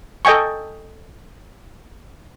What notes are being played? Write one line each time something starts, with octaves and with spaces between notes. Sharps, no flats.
A4 D#5 G5 G#5 C#6